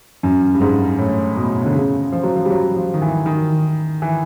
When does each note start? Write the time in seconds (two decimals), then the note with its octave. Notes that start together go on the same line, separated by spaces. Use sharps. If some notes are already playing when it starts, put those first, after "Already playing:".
0.23 F#2
0.54 G2
0.61 G#2
0.98 A2
1.37 B2
1.65 D3
1.75 C#3
2.12 F3
2.23 F#3
2.36 F3
2.45 G3
2.50 F#3
2.76 F3
2.94 D#3
3.02 E3
3.26 D#3
4.02 E3